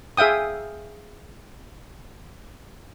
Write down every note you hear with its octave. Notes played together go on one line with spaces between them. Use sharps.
G#4 E5 F5 G5 D#6